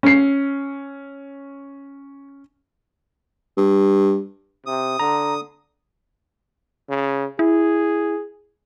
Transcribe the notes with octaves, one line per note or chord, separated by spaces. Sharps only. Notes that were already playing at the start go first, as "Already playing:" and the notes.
C#4 C7
G2
C3 D#6
D3 A#5
C#3
E4 G#4